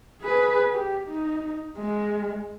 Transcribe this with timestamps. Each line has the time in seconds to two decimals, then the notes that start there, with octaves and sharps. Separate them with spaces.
0.22 G#4 B4
0.73 G4
1.07 D#4
1.77 G#3